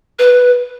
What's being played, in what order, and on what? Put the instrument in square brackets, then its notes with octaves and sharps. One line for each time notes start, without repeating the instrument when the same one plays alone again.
[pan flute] B4